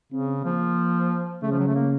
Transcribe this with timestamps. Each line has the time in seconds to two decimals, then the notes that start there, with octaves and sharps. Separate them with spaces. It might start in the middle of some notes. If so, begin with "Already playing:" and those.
0.12 C#3 C4
0.45 F3 A#3
1.43 C#3 A3
1.51 F3
1.59 F#3
1.68 A3
1.75 A#3